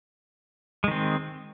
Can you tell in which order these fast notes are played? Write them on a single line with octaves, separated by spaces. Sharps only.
G#3 D#3 C4